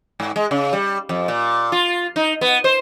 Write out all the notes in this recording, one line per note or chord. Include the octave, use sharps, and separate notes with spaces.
G#2
G#3
C#3
G3
F2
A#2
F4
D#4
B3
C5